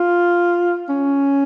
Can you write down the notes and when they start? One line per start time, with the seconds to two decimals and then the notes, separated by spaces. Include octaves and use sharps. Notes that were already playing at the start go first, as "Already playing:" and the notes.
Already playing: F4
0.89 C#4